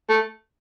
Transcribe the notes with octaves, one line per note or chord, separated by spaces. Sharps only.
A3